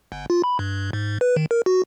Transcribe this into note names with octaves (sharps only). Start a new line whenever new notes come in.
G1
F4
B5
G2
G#2
B4
D#3
A#4
F#4